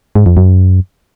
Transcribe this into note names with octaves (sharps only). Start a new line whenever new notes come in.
G#2
F2
F#2